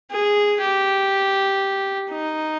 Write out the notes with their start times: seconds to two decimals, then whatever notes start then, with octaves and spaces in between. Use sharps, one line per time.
0.11 G#4
0.61 G4
2.11 D#4